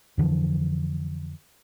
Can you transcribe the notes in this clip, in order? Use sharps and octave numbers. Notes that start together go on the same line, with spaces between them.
F2 D3 E3 F3